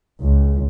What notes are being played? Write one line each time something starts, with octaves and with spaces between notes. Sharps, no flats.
C#2